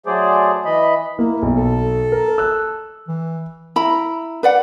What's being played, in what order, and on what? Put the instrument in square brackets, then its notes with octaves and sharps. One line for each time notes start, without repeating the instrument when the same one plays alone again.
[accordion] F#3 A3 G#4 C5 D5
E3 D#5 B5
[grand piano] A#3 [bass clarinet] E4
[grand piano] B1
[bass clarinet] A4
[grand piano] A#4
E6 F#6
[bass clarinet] E3
[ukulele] E4 A#5 B5
B4 D5 F#5